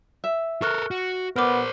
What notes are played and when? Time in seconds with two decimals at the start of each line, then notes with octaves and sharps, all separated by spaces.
0.24 E5
0.62 A4 A#4 C#6 F6 F#6
0.91 F#4
1.36 B3 A#4 C5 D6 F6